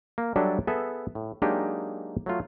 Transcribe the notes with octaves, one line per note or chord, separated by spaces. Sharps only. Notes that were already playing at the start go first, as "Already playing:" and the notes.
A#3
F#3 G3 D4 A4 D#5 E5
B3 G#4 A4 E5
A2
F#3 G#3 A#3 D4 D#4 G4
F#3 A3 F4